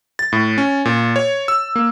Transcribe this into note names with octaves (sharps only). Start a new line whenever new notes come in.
A6
A2
C#4
A#2
C#5
E6
A#3